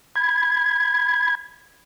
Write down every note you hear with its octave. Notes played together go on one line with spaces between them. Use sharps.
B5 G#6